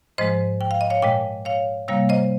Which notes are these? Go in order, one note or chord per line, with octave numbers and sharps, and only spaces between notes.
G#2 F3 G#3 C5 D#5
G5
F5
D#5
C#5 F5
A#2 G#3 D#5 G5
C#5 F5
C3 G3 A#3 C#5 F5
C5 D#5